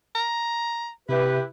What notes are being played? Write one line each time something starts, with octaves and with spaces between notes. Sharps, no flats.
A#5
C3 E4 G4 B4 E5